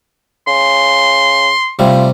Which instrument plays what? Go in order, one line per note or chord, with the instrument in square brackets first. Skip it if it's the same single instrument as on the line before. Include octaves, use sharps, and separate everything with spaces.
[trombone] C#3 [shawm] C6
[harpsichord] C3 G3 A3 [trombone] F4